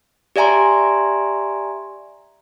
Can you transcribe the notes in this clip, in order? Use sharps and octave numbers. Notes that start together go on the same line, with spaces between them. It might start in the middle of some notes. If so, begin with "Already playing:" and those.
G4 D5 E5 G#5 A#5 C6